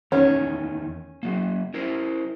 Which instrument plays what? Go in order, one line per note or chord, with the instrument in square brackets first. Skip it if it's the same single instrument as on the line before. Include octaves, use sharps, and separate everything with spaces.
[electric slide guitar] E2 D#3 A3 [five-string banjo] C#4
[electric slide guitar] F#3 A#3
E4 A#4 C5